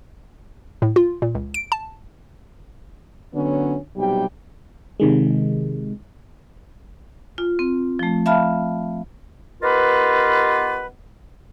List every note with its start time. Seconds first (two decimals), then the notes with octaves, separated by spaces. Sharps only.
0.82 A2
0.96 F4
1.22 A#2
1.35 C#2
1.54 D7
1.72 A5
3.33 D3 F#3 B3 C#4
3.96 B1 C3 G3 G5
5.00 C3 D#3 G#3
7.38 F4
7.59 C4
7.99 F3 A3
8.26 E5 F5 A5 B5 F6
9.63 B3 D#4 F4 G4 A#4 B4